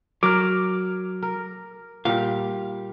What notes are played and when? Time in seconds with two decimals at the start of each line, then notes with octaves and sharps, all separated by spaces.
0.23 F#3 A#4 D6 F6
1.22 A#4
2.05 A#2 G3 F5